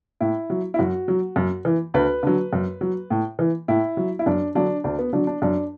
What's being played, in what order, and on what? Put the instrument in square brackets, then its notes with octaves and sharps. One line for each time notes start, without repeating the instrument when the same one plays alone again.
[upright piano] A2 E4
F#3
E4
F#2 F#4
F#3
F#2
E3
D2 B4
D3 F#3
F#2
F#3
A2
E3
A2 E4
F#3
E4
F#2 D4
D3 F#3 D4
D2 D4
B3
D3 F#3 D4
D4
F#2 D4